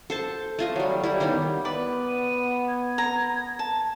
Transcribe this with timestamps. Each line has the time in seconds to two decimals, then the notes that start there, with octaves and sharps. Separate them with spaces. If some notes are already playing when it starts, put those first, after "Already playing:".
0.10 A4 C5 A5
0.59 A3 F4 D#5
0.76 F#3 G3
1.04 G3 E4
1.20 D#3 G3 A#3 B3
1.65 B3 B4 D5 B5
2.07 D#7
2.68 G#6
2.98 A#5
3.59 A5